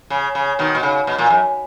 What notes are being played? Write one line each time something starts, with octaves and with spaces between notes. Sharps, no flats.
C#3
C#3
B2 D#3
B2
C#3
B2
A#2
F#2